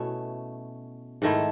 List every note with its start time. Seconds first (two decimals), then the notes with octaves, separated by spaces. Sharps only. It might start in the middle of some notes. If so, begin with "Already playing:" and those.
Already playing: B2 A3 C#4 E4
1.22 G#2 D#3 A3 E4